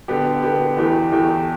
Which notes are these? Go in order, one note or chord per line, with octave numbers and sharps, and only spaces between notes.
D3 B3 G4
D3 B3 G4
E2 E3 A3 G4
E2 E3 A3 G4